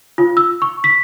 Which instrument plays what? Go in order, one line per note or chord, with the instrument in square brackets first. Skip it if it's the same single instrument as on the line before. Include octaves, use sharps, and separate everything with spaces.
[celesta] F4
E6
C#6
B6